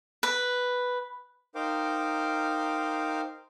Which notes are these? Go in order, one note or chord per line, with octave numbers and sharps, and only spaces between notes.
B4
D#4 A#4 C5 F5 G5 D6